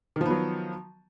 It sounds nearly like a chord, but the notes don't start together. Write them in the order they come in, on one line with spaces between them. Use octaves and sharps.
D#3 F3 B3 F#3